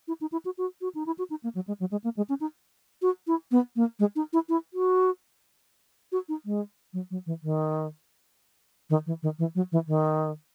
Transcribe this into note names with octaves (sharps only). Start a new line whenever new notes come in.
E4
D#4
E4
F#4
F#4
F#4
D#4
E4
F#4
D#4
A#3
F#3
G#3
F#3
G#3
A#3
G#3
C#4
D#4
F#4
E4
B3
A#3
G#3
D#4
E4
E4
F#4
F#4
D#4
G#3
F#3
F#3
E3
D#3
D#3
E3
D#3
E3
F#3
E3
D#3